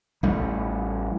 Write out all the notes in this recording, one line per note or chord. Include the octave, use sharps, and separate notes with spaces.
A1 G3 A3